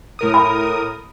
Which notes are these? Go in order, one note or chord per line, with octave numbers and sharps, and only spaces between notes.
A2 A#4 D#6
B5